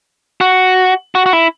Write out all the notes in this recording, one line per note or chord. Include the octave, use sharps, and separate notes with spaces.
F#4
F#4
F#4
E4